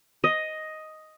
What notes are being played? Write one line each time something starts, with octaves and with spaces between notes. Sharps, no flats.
D#5